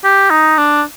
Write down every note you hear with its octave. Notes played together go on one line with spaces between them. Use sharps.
G4
D#4
D4